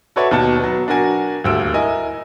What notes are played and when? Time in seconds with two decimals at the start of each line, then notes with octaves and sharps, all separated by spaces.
0.16 F#4 A4 B4 C#5 D5 E5
0.31 D#2 B2 A5 C#7
0.59 F#3 B3
0.88 D4 F#4 A#4 G#5
1.44 D#1 D2 E6 D7
1.74 E4 A#4 D#5 G#5